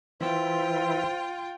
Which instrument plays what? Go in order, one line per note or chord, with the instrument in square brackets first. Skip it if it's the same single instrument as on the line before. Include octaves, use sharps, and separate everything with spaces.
[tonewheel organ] E3 E4 [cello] F4 G5 [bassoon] C5